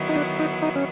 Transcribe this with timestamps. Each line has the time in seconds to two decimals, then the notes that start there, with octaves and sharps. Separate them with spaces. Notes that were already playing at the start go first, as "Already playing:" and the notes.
Already playing: D#3 F#3 B3 E4
0.09 D#4
0.16 D4
0.39 D#4
0.63 D#4
0.76 C#4